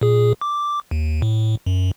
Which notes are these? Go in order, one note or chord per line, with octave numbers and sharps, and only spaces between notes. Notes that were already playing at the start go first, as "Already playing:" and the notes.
A#2 G#4
D6
D#2
A2
F#2